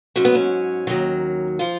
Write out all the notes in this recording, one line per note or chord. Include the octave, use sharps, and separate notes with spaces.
G#2 F#3 C#4
B3
C#4
D#2 D#3 F#3
F3 F4